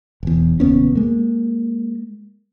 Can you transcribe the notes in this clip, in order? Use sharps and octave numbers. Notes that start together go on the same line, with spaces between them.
E1 E2
F1 D#2 B3 C#4
G#3 A#3